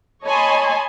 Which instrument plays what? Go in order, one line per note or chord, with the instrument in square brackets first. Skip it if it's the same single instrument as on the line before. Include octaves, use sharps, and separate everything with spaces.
[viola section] C#5 D#5 G#5 A5 B5 C6